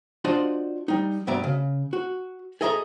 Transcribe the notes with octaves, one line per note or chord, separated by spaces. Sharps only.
D4 F4 F#4 C5 D5 D#5
G3 D#4
G2 B2 D5 E5 A#5
C#3
F#4
G#4 A4 D#5 E5 F#5 A#5